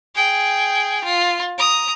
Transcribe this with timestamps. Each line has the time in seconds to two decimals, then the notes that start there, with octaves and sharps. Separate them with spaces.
0.15 G#4 G5
1.04 F4
1.58 A#5 D#6